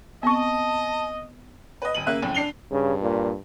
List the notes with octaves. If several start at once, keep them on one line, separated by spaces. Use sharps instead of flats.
B3 C4 D#5 G#5 A5 C#6
B4 D#5
D#1 D#7 F#7
C#3 A#3 E5 F#6
F1 C#2 F#2 A2
D4 C7 F7 G7
G2 C#3
A#2